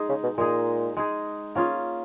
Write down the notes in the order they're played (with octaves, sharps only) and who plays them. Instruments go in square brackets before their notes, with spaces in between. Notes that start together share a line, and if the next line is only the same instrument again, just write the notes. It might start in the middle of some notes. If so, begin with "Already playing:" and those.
Already playing: [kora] G#3 D#4 G#4
[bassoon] C#3
B2
[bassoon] A#2 [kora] G#3 D#4 G#4
[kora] G#3 D#4 G#4
A#3 C#4 F4 G#4